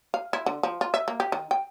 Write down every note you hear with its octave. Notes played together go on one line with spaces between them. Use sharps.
F5
E4
D3
F3
F4
E5
A#3
G4
D#3
G5